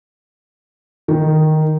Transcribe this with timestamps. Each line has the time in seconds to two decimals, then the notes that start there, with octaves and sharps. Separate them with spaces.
1.08 D#3